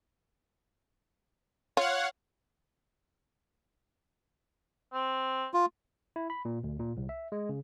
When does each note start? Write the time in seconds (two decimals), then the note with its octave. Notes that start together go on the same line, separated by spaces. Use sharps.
1.77 F4 C#5 F5 F#5
4.93 C4
5.54 F4
6.16 E4
6.30 B5
6.45 A#2
6.64 D2
6.79 A#2
6.97 C2
7.09 E5
7.32 G#3
7.49 C#3